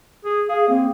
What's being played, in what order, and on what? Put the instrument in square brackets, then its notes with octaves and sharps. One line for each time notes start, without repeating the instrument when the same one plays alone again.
[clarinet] G#4
[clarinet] G#4 [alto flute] F5
[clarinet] A#3 [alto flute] C4